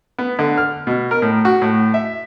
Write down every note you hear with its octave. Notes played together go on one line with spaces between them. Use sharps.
B3
D3
F6
B2
A#4
A2
F#4
A2
E5